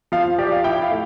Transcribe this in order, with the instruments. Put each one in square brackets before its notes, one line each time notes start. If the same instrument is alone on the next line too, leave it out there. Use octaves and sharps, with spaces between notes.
[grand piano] F3 [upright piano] F5
[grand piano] G4 [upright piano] D5
[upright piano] F5
[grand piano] E4 [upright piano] G5
[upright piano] F5
[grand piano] A3